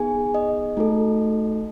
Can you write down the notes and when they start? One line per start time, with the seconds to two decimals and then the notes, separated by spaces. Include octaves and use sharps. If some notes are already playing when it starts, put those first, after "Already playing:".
Already playing: B3 D#4 G#4 G#5
0.34 D#5
0.77 A3 D#4 F#4 A4